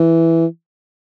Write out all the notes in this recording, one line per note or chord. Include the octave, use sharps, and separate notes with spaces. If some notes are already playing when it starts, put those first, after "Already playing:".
Already playing: E3